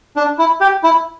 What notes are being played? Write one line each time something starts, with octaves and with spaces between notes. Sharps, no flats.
D4
E4
G4
E4